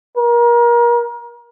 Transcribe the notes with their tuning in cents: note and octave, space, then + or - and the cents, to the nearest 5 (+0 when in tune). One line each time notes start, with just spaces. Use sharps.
A#4 +30